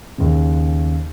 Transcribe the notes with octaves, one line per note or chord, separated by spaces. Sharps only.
D#2 C#3